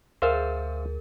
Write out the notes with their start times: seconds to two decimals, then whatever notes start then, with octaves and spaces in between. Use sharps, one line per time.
0.22 D2 G#4 A#4 C5 E5 F5